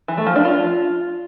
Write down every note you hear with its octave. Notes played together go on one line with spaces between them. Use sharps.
E3
A3
F3
D4
F4